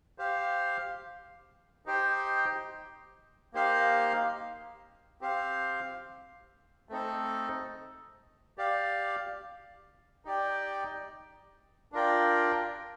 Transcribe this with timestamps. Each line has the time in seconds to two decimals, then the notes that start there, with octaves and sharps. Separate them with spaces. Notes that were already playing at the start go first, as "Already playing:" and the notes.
0.18 G4 C5 F5
1.86 D#4 G4 C5 G5
3.53 A#3 D#4 G4 C5 F5
5.21 C4 G4 C5 F5
6.89 A3 C4 D#4 A4
8.58 G4 D5 F5
10.25 D#4 G4 D5 G5
11.92 D4 F4 A#4 D5 G5